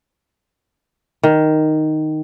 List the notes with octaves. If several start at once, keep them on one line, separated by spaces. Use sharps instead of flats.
D#3